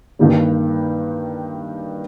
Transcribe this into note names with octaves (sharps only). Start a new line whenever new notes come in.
G2 D#3 G3 A#3